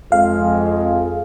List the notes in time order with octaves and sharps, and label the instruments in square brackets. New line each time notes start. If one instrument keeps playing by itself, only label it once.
[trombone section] F2 G#3 [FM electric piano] F5